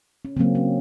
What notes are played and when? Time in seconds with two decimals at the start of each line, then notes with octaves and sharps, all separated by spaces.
0.25 C#4
0.36 C#3 C4
0.39 F#3 A#3
0.55 C#4